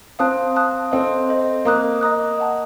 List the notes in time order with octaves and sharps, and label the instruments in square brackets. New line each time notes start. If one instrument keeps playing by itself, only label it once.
[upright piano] C4 [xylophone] F5 A5 D#6 F#6
[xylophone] F5 A5 D#6 F#6
[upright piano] C4 [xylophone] A4 C5 D#5
[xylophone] A4 C5 D#5
[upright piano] A#3 [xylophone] D#5 A#5 D#6 F#6
[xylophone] D#5 A#5 D#6 F#6
D#5 F#5 A5